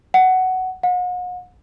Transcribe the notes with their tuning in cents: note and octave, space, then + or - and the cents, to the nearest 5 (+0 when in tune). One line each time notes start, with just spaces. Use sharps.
F#5 +10
F#5 -40